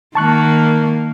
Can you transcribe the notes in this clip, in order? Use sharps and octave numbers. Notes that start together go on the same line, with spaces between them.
D#3 A#3 A5 C#6 F#6